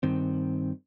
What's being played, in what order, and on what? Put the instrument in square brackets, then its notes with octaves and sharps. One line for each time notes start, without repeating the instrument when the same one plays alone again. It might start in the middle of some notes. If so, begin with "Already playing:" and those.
[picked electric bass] G2 D#3 C4